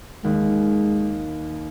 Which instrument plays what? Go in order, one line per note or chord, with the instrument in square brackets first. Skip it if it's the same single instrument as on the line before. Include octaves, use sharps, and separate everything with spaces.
[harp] D#2 [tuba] G#3